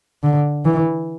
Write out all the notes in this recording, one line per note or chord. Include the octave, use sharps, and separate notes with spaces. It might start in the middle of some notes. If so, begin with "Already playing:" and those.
D3
E3